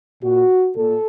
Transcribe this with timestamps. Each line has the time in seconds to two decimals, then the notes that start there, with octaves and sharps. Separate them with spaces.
0.23 A#2 F#4
0.77 A#2 A4